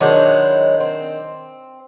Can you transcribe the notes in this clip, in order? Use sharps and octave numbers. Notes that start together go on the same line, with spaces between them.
D#3 F#3 G#3 D4 E4 C5
C4